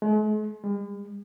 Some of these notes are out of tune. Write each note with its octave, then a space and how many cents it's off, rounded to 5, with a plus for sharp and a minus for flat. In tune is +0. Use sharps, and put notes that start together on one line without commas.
G#3 +45
G#3 -45